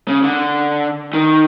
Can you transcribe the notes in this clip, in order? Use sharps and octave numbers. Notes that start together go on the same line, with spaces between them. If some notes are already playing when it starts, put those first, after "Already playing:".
C#3
D3
D#3